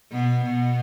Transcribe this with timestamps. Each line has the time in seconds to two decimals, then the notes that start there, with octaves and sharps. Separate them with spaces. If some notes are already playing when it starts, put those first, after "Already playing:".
0.12 B2 B3
0.45 B2 B3